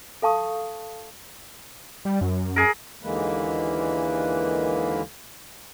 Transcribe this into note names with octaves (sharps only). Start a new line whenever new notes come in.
A4 F5 A5 C#6 D#6
G3
F#2
G#4 A#4
D#2 D3 E3 G#3 A#3 B4